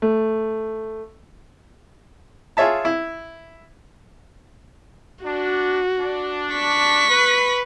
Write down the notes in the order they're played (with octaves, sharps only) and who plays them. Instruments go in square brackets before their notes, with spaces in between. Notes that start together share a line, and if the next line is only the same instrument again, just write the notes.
[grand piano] A3
[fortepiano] F4 G#4 C#5 E5 A5
E4
[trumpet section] D4 [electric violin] F#4
[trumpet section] D4
[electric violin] C#6 B6
[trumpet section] B4